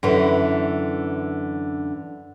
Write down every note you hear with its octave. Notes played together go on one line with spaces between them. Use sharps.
F#2 D3 E3